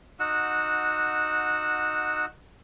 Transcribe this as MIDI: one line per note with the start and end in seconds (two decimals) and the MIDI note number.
0.20 2.26 63
0.20 2.26 66
0.20 2.26 78
0.20 2.26 88